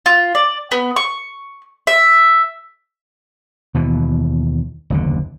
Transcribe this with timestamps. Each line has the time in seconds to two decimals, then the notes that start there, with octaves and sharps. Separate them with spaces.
0.06 F4
0.35 D5
0.71 B3
0.96 C#6
1.87 E5
3.74 D#2 B2 E3
4.90 F#1 D#2 D3